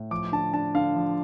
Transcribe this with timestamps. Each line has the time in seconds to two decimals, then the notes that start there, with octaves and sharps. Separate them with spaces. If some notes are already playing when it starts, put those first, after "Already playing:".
Already playing: A2
0.11 F3 D6
0.32 D3 A5
0.53 D4 A5
0.75 D3 F5
0.96 F3